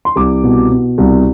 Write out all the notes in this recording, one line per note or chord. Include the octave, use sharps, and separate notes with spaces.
C6
C2 D6
B2
B2
C2